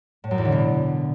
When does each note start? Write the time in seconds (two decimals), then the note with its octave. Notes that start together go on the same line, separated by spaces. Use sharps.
0.24 A2
0.31 F#2
0.38 E2
0.45 D3
0.52 B2